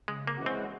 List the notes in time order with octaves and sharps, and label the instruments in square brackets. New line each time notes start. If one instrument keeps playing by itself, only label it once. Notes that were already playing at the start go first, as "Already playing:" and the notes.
[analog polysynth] C#3 [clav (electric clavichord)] G#3
[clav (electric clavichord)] A#3
[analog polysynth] E3 G#3 C#4 F#4
[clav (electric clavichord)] C4